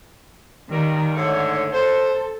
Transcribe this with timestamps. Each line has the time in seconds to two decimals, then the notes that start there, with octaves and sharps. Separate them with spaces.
0.69 D#2 D#3 G3 A#4
1.16 G#2 D3 A3 C#5
1.72 A4 C5